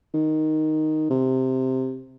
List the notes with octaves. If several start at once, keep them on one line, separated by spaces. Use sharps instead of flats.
D#3
C3